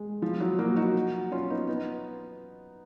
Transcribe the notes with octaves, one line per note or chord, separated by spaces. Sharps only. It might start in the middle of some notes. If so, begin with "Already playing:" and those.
Already playing: G#3
F3
F#3
F#3 A#3
D#4 F#4
C#4 F4
B3 D#4
B3 D#4